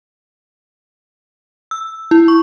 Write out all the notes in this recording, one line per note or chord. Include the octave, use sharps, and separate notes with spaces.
E6
E4
C#6